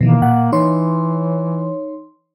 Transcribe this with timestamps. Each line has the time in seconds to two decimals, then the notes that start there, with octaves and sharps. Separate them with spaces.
0.01 B2 D#3 E3 A#3
0.22 A#2 F#5
0.52 E3 D#4 C#5 C6